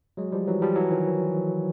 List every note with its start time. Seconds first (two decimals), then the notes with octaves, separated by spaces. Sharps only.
0.17 F#3 G#3
0.32 F3 G3
0.47 E3 F#3
0.62 F3 G3
0.76 E3 F#3
0.91 D#3 F3